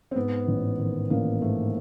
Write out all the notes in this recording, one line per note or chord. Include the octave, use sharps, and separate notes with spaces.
C4
G#2 B3
A1
D#3
A1 A#3
G#2 A3